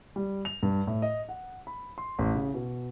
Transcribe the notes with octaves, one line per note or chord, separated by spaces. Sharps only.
G3
F7
G2
A2
D#5
F#5
B5
C6
A1
C#3
B2